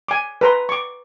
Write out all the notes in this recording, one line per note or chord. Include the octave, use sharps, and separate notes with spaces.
G#5 D6
B4 A#5 C6
C#6 D6